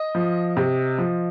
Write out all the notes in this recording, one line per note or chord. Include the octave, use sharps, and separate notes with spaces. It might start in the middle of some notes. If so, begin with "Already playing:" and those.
Already playing: D#5
F3
C3
F3